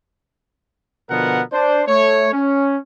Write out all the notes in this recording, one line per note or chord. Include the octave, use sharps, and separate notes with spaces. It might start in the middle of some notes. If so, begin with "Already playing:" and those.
B2 D3 F3 B3 A#4 F#5
D4 C5
A3 C#5
C#4